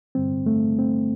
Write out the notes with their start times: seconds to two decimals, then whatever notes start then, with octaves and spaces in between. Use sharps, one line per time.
0.15 G2 D3 G3 C4
0.46 A3
0.78 C4